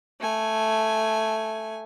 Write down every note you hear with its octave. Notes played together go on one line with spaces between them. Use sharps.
A3 G#5